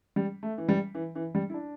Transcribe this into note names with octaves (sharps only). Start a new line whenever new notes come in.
G3
A3
E3
G3
E3
E3
G3
E4
D4